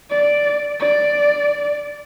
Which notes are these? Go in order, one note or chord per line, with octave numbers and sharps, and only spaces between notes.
D5
D5